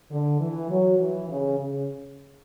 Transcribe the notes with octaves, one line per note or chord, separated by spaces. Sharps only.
D3
E3
F#3
E3
C#3
C#3